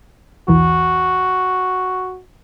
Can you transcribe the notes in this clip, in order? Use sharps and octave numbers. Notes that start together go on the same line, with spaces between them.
B1 E2 E3 F#4